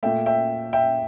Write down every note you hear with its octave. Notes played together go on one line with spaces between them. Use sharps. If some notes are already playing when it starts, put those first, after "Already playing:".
A#2 A3 E5 G5
E5 G5
E5 G5